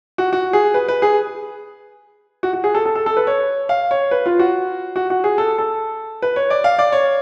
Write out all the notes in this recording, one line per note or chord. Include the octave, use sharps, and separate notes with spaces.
F#4
F#4
G#4
B4
B4
G#4
F#4
F#4
G#4
A4
A4
A4
A4
B4
C#5
F5
C#5
B4
F4
F#4
F#4
F#4
G#4
A4
A4
B4
C#5
D5
F5
D5
C#5